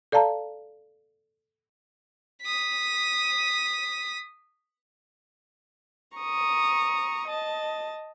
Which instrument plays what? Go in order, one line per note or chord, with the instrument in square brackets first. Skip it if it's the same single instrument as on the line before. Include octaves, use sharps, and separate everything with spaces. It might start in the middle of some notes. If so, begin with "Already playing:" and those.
[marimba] A4 D5 F5 A5 A#5
[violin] D#6 B6
[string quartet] A#5 C#6 D#6
D#5 A5